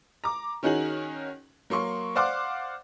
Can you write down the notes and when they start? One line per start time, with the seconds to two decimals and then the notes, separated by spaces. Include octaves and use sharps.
0.24 A#5 D6
0.63 D#3 C#4 D#4 F#4 G#4 F#7
1.70 F#3 A#3 C6 C#6
2.15 C5 D5 F5 F#5 C6 D6